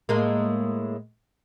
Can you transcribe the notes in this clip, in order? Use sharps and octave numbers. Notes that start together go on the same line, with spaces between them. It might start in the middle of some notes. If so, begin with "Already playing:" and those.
A2 G#3 A#3